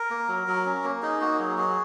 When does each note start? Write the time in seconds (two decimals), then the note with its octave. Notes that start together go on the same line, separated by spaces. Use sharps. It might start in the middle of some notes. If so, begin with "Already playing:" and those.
Already playing: A#4
0.10 A#3
0.28 F#3
0.47 F#3
0.66 C#4
0.84 A#3
1.02 D#4 G#4
1.21 A#3 F#4
1.39 F#3 G#4
1.58 F#4 G#4